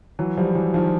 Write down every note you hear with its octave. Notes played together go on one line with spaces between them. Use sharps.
E3 F#3
F3 G3
E3 F#3
D#3 F3